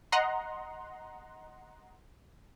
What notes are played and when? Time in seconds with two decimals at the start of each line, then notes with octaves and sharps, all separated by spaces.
0.12 D#5 F#5 A#5 C6